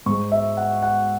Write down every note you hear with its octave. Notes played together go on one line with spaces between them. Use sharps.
G#2 G#3 C#6
E5
F#5
F#5